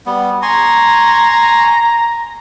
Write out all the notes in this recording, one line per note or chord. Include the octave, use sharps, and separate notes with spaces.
G3 B3
G#5 A#5 C6 C#6